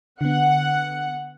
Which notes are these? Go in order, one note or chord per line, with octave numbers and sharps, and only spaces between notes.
D3 B3 F#5